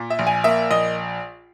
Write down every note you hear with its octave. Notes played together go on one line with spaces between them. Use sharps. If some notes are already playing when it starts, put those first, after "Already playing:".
Already playing: A#2
E5
A#1
G#5
A#3 E5
A#1 D#5